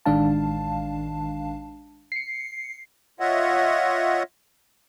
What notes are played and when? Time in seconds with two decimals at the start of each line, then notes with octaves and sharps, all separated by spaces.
0.06 A1 D#3 G#3 D4 F5 A5
2.12 C7 C#7
3.20 F4 C#5 D#5 E5 F#5